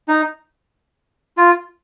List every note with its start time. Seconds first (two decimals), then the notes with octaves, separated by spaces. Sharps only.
0.08 D#4
1.37 F4